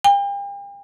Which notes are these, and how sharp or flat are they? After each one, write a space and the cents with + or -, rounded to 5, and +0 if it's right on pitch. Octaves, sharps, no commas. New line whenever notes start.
G5 +40